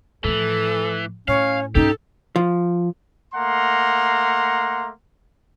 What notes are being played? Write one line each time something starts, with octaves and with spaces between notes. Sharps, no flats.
A2 E3 F3 A4
A2 C#4 C#5 F5
G#2 C#4 D#4 G4 A4
F3
A3 A#3 F#5 A#5 C6